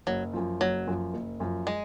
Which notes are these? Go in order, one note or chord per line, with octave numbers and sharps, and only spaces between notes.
F#1 F#3
F#2 F3
F#1 F#3
F#2 F3
F#1
F#2 F3
G#3